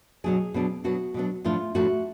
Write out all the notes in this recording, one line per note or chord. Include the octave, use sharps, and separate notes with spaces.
B2 F#3 B3 D4 G#4
B2 F#3 B3 D4
B2 F#3 B3 D4 F#4
B2 F#3 B3 D4
A2 F3 A3 D4 F4
A2 F3 A3 D4 F#4